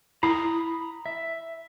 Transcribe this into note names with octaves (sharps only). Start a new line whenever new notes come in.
E4 A#5 B5 D#6
E5